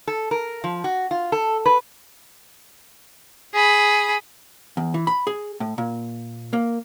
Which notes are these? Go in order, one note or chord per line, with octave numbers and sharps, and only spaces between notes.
A4
A#4
F3
F#4
F4
A4
B4
G#4 B5
E2
E3
B5
G#4
A2
A#2
A#3